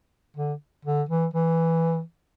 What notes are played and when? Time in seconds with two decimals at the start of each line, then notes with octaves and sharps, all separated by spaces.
0.37 D3
0.85 D3
1.09 E3
1.34 E3